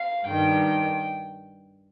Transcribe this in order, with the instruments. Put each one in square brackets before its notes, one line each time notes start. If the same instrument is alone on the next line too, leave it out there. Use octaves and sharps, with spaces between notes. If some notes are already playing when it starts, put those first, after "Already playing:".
Already playing: [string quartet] F5
G2 D#3 G5
G5